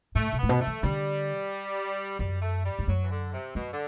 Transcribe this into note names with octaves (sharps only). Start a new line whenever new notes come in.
A2 A3
B2
A2 B3
B2
A3
E3
D3 G3
F#2 G3
A3
G3
G2
F#2 F#3
E3
D3
C3
F#2 B2
D3